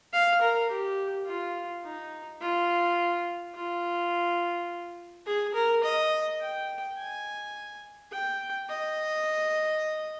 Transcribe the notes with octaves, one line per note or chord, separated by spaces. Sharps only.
F5
A#4
G4
F4
D#4
F4
F4
G#4
A#4
D#5
G5
G#5
G5
D#5